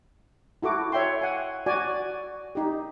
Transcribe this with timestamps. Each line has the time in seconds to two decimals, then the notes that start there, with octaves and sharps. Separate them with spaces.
0.63 E4 F#4 A4 D6
0.92 C#5 E5 G5 C6
1.21 F#5 G#5
1.66 F#4 D5 G#5
2.55 D#4 G4